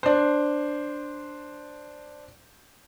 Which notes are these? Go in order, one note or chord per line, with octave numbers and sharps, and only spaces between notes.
D4 C5